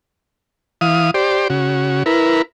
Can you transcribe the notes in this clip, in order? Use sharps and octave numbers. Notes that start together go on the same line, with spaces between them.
E3 F5 D#6
G4 C5 D5
C#3 F#4
E4 A#4 B4